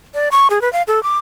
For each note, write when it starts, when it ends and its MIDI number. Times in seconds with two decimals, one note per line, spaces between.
0.14 0.29 74
0.32 0.48 85
0.50 0.61 68
0.62 0.71 71
0.73 0.82 77
0.88 1.02 69
1.03 1.18 86